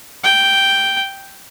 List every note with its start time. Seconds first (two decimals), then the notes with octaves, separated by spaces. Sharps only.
0.24 G5